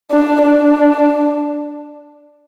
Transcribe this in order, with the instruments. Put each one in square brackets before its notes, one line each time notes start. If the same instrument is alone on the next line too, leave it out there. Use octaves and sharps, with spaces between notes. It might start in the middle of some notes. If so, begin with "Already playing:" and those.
[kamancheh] D4
D4